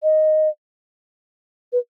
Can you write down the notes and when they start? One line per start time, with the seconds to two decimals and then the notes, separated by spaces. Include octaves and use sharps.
0.03 D#5
1.72 B4